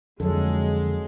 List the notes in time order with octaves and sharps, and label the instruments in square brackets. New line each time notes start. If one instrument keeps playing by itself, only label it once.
[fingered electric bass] F2 [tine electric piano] D3 [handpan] F#3 A4 [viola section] G#3